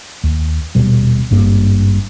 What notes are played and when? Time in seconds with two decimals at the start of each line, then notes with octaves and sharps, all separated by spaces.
0.24 D#2
0.75 D#1 B2 G3
1.31 G#1 G2 A#3